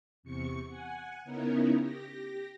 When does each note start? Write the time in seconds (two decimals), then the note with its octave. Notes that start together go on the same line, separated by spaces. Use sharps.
0.23 E2 C3 C#6 C#7
0.67 F#5 G#5
1.24 C#3 B3 C#4 D#4 E4 A#4
1.78 G4 A#6